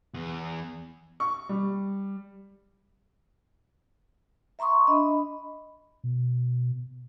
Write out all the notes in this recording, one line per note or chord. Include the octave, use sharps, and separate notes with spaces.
E2
C#6
G3
E5 A#5 C6 C#6 D#6
D4 D#5 B5
B2